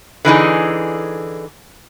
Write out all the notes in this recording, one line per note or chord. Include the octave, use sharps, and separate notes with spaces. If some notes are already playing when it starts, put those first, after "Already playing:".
D3 E3 D#4 G#4